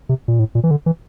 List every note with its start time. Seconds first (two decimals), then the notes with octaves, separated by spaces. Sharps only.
0.09 C3
0.28 A#2
0.39 A2
0.55 A#2
0.64 E3
0.71 D3
0.86 E3